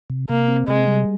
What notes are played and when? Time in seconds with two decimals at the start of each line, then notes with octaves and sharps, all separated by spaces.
0.10 C3
0.29 C3 A#3
0.48 C4
0.68 C3 G#3
0.87 G3